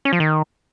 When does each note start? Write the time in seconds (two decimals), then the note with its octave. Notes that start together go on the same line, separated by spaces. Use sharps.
0.05 C#4
0.13 F3
0.20 D#3